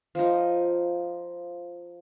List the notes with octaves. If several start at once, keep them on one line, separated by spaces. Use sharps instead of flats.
F3 D#4